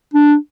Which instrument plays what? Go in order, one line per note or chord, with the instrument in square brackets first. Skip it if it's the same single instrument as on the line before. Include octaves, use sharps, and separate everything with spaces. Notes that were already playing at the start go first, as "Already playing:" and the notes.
[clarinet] D4